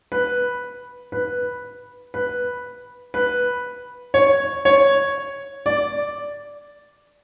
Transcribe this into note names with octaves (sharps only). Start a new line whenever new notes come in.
B4
B4
B4
B4
C#5
C#5
D5